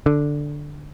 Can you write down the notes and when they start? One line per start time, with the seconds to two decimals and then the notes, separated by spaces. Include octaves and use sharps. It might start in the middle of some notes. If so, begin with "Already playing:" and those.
0.06 D3